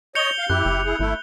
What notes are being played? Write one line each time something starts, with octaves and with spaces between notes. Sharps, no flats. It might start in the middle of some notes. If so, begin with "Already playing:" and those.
C#5 D#5 G6 C#7 F7 G7
F5
F#2 E4 G4 F#6
F#1
E4 G#4
G#1 A3 E4